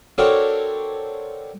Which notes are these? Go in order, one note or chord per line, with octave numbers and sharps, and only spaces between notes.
C4 D4 F#4 A4 A#4 C#5